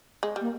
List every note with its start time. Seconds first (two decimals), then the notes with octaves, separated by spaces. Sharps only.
0.23 G#3
0.36 G3
0.41 A#3